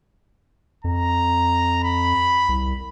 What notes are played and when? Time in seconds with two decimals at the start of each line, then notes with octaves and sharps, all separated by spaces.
0.84 F2 A#5
1.83 B5
2.49 C2